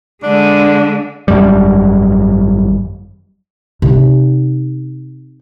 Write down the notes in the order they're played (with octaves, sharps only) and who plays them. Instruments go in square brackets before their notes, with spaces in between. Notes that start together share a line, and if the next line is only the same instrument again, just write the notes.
[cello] D3 G#3 [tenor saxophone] D4
[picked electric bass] G#1 F#2 G3
[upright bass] C3 D#4